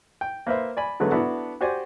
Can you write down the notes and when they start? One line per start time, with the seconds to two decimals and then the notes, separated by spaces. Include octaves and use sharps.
0.21 G5
0.47 A#3 B4 C5 E5
0.77 D5 G#5 B5
1.00 D3 F#3 G#3 A3 B3 B4
1.12 B3 D4 E4 F#4 A4
1.61 F#4 G4 C5 D5 G#5